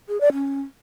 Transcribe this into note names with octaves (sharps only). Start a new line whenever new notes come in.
G#4
D5
C#4